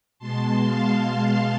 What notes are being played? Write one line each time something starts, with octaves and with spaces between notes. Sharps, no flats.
B2 G#3 A5 C6
F5 A5
F5 A5